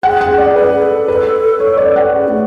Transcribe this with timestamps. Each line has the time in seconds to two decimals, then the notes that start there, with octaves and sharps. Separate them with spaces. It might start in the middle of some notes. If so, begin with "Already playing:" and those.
0.03 G#4 F#5
0.21 F#5
0.29 G#4
0.38 D5
0.55 G#4 B4
0.82 A4
1.08 B4
1.60 C#5
1.77 D5
1.96 F#5
2.13 G#4
2.28 A3